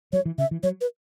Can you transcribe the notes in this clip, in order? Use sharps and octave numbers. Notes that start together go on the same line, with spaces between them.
F#3 C#5
E3
C#3 E5
E3
F#3 C#5
B4